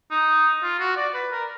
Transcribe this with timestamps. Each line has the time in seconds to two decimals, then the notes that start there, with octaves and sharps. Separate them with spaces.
0.11 D#4
0.63 F4
0.80 F#4
0.97 D5
1.14 B4
1.32 A#4